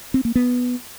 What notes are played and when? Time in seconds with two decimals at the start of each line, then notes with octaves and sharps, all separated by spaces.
0.14 C4
0.25 A#3
0.35 B3